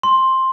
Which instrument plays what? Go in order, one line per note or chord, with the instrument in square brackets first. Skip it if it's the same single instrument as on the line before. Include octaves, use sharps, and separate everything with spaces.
[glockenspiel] C6